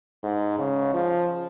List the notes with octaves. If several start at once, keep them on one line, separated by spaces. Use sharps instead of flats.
G#2
C#3
F3